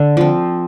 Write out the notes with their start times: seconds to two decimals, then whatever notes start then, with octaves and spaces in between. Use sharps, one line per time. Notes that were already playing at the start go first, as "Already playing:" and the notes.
Already playing: D3
0.17 F3 C4